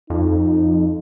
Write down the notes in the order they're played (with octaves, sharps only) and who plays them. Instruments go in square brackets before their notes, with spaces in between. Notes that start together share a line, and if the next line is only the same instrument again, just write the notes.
[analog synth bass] F2 [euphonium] D#4